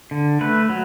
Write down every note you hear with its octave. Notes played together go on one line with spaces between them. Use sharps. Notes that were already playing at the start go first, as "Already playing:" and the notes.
D3
A3 B4
F#3